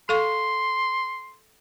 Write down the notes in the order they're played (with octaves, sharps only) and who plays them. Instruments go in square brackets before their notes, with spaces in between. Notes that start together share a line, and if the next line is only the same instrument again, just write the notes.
[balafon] A4 F5 C#6 [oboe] C6